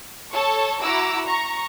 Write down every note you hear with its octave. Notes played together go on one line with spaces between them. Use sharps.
A4 C#5 A5 C#6
E4 F#4 A#5 D6 E6
A#5 C#6